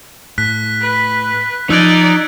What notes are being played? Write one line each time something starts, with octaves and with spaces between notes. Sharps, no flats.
A2 F#6 B6
B4
F3 D#4 D5 E6 F#6 G#6